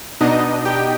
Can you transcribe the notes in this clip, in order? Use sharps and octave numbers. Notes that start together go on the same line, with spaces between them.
B2 B3 D4 D#4 D#5
G4 G5